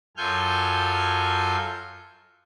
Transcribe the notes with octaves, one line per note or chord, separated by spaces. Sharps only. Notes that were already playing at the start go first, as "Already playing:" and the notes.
F#2 F4 A4 G#5 F6 G6